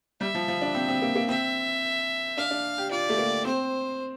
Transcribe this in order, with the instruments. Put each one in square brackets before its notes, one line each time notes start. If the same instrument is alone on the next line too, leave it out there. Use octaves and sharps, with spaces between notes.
[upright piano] G3 [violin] E5
[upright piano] F3
F3
D4
C4
C4
A#3
A#3
[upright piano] C4 [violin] E5
[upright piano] D4 [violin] F5
[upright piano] D4
G4
[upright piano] F4 [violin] D5
[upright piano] A3
A#3
[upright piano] C4 [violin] C5